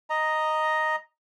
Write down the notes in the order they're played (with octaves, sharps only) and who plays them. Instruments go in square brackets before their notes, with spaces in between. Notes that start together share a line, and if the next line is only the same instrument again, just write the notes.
[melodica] D#5 A#5